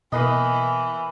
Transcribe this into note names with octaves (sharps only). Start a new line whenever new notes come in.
B2 E3 A#3 B4 D#5